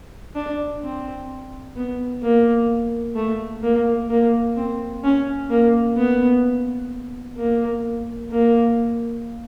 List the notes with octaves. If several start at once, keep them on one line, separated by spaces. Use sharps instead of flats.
D4
C4
B3
A#3
A3
A#3
A#3
C4
C#4
A#3
B3
A#3
A#3